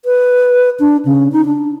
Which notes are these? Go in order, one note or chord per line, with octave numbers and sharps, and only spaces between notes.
B4
D4
C#3
D#4
D4